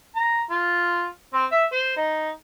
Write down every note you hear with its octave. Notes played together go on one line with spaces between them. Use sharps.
A#5
F4
C4
E5
C5
D#4